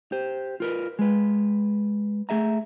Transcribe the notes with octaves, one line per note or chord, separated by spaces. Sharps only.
G4 C5
F4 A#4 B4
G#3 B4
A3 G#4 E5 A#5